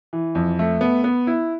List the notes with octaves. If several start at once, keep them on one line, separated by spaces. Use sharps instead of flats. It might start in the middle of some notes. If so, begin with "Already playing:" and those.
E3
F2
A3
B3
B3
E4